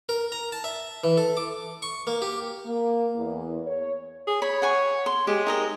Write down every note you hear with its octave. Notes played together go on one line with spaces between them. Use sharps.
A#4
A#5
A5
E5
E3
A4
D6
C#6
A#3
G4
A#3
E2
C#5
G#4
C#5 B5
F#5 G#5 C#6
C6
G#3 G4
D#4 A#4 D#5